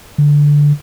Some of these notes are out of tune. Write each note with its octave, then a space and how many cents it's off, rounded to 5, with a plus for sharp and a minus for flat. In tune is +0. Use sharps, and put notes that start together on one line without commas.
D3 -5